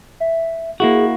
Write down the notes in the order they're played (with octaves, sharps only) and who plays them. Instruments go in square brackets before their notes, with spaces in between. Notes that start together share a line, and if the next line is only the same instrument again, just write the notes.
[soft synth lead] E5
[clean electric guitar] A#3 E4 F#4 [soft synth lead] G#4